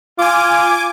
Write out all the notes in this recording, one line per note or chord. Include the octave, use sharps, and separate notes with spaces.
F4 G#5 D6